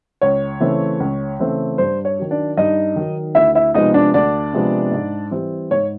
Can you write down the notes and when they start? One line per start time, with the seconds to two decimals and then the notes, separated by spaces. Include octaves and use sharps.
0.21 C#2 C#5
0.60 C#3 E3 A3 C4
1.00 C#2
1.39 C#3 E3 A3 C4
1.78 G2 C5
2.05 C#5
2.18 D#3 F#3
2.31 D4 D5
2.57 G2 D#4 D#5
2.96 D#3 F#3
3.35 D2 E4 E5
3.55 E4 E5
3.74 C3 F3 G#3 B3 D#4 D#5
3.94 D4 D5
4.14 D2 D4 D5
4.53 C3 F3 G#3 B3
4.92 G#2
5.31 E3 G3 C4
5.71 G#2 C#5